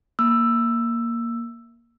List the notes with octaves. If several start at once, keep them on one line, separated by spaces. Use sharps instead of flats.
A#3 E6